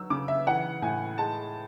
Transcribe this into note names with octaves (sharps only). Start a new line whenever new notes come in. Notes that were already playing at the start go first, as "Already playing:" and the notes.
Already playing: F#3 E6
C#3 D6
E5
E3 F#5
A2 G#5
G#3 A5